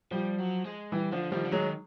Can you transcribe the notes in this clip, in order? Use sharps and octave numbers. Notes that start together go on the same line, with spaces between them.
F3 G3
F#3
G#3
E3 G3
D3 F3
D#3 F3 G3
D3
D#3 F#3 G#3